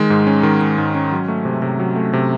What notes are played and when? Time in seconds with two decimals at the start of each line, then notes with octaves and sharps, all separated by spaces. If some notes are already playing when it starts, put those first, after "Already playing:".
Already playing: D#3 G#3
0.10 G#2
0.27 C#4
0.43 D#3
0.61 G#3
0.78 G#2
0.95 C#4
1.12 F#3
1.28 A3
1.45 C3
1.62 C3
1.80 F#3
1.96 A3
2.13 C3